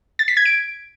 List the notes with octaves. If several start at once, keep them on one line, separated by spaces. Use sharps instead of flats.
A6
B6
G#6
D7